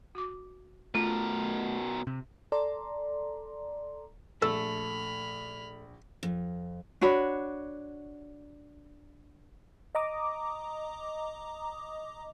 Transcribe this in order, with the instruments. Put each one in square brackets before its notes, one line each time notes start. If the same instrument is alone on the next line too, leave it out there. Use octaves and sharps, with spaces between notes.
[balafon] F#4 D6
[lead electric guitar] B2 A#4 [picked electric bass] A3 [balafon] F4
[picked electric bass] C3
[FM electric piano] A4 D5 A#5 C6
[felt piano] A#1 [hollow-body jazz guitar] A3 [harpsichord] A4 [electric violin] B5 F6
[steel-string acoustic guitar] F2
[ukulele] D4 F#4 C#5 B5
[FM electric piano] D#5 A#5 D6 D#6